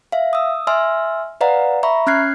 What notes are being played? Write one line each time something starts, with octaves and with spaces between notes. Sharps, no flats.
E5 F5
D#6 E6
D#5 E5 G#5 C6 E6 F6
B4 D5 D#5 F5 F#5 A#5
E5 A#5 B5 C#6
C#4 F6 F#6 G#6 C7